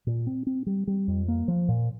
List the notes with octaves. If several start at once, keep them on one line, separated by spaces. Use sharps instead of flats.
A#2
C4
C4
G3
G3
F2
A#3
F3
A#2